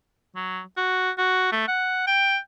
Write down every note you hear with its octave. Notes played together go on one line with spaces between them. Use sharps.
F#3
F#4
F#4
A3
F#5
G5